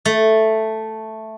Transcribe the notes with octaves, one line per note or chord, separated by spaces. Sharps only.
A3